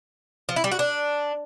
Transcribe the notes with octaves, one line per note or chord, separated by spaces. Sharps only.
F3
E4
G3
F#4
D4